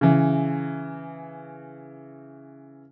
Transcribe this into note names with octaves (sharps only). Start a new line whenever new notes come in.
C#3 E3